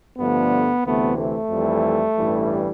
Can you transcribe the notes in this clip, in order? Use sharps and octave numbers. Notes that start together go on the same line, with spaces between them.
G2 D3 F3 A3 B3
D2 C3 E3 A3 B3
A3
F2 E3 G3
A1 G2 E3 G3